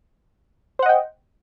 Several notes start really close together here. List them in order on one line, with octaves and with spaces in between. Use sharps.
C5 F#5 D#5 G5